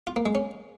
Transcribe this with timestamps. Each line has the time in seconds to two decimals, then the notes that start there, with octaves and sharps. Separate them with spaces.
0.07 F4
0.16 A#3
0.26 G#3
0.35 C#4